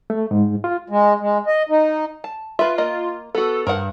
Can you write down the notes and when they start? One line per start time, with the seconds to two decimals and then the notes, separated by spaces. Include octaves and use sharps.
0.10 A3
0.31 G#2
0.64 F4
0.89 G#3
1.20 G#3
1.47 D#5
1.69 D#4
2.24 A5
2.59 F4 B4 E5
2.78 A#3 D#5
3.35 B3 F#4 A4
3.67 G2 A#4 C5 F#5